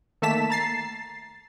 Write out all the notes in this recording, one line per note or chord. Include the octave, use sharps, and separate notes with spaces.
D#3 A3 A#3 A5 B6 E7
A#5 A6 C7